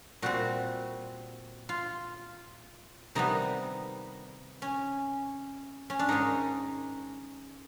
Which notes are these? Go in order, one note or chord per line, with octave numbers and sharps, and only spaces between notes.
A#2 G3 C4 F#4
F4
C3 D#3 G3 B3 D#4
C#4
C#4
D4
G#2 D#3 G#3 C#4 D#4